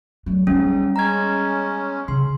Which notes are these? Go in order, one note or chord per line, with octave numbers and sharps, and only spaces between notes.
D2 F#3
G#2 G3 B3 C#4
G#3 C#4 A#5 G#6
C#3 C6